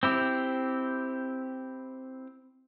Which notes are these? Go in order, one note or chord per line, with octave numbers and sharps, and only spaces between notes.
C4 E4 G4